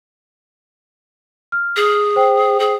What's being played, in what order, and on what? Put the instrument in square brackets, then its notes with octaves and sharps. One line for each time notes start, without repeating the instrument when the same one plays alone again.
[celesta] F6
[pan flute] G#4
[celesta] C5 G5
[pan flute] G#4